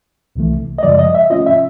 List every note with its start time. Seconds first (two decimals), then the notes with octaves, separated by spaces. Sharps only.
0.36 C2 C3 E3 A3
0.78 D#5
0.83 F#2 C#3 F3 G#3 D5
0.99 D#5
1.15 E5
1.30 C3 F3 A3 C#4 F4 D#5
1.46 E5